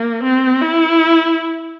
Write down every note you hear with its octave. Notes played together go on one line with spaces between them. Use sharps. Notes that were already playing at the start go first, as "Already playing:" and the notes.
Already playing: A#3
C4
E4